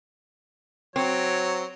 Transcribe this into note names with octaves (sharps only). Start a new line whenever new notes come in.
F#3 C4 C#5